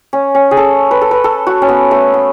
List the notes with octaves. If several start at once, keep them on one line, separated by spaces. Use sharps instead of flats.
C#4
C#4
G#4
A4
B4
A4
B4
A4
F#4
C#4
B3
A3
B3